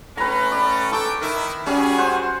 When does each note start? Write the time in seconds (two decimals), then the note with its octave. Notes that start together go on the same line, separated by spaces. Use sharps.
0.17 A2 C#4 B4 A#5
0.52 D5
0.92 A4 G5 C#6 D6
1.22 D#3 E4
1.67 G3 C#4 F#4 G#4
1.98 C5 F#5